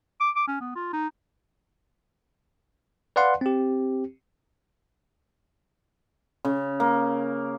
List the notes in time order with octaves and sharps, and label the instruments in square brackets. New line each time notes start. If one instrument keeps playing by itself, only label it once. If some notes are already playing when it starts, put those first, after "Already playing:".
[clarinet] D6
D6
C#4
B3
F4
D#4
[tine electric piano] B4 D5 F5 F#5 C6
C4 G4
[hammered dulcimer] C#3
A#3